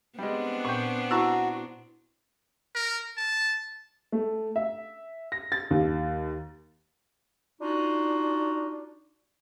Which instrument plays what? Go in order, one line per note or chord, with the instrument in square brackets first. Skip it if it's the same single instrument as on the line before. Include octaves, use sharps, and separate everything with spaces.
[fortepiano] G3 G#3 [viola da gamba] B3 C4 D4
[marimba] A#2 [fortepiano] G5 C#6
[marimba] E4 [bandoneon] F#4 [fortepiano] A5 A#5 C#6
[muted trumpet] A#4
A5
[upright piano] A3
E5
A#6
A6
D#2
[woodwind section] D4 D#4 F4 F#4